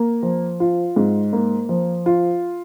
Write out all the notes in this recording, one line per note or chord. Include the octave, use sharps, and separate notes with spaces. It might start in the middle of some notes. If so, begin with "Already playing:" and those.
Already playing: A#3
F3
F4
G#2
A#3
F3
F4